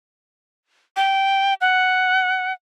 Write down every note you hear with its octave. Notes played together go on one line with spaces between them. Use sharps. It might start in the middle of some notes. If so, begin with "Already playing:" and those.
G5
F#5